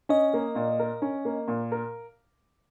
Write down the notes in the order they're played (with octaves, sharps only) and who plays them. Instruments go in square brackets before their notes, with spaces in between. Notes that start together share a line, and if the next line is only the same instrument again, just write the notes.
[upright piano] C#4 [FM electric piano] D#5
[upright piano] A#3
A#2
A#4
C#4
A#3
A#2
A#4